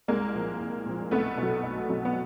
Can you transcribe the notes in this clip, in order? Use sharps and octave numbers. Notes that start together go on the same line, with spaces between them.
C2 G#3 A#3
A#2 F3
C2
A#2 F3
B1 A3 B3
B2 F#3
B1
B2 F#3
B3